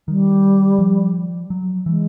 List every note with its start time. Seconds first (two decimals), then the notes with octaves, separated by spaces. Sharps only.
0.08 D#3 G3
0.79 F3
1.50 F#3
1.86 E3 G#3